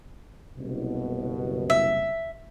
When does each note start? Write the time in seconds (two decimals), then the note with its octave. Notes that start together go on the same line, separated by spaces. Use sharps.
0.56 F#1 C2 B2
1.70 E5